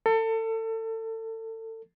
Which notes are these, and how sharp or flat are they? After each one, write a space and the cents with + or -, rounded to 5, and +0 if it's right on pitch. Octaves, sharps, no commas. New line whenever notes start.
A4 +30